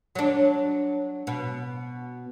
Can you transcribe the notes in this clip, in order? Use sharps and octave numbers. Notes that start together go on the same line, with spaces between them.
F#3 D4
B2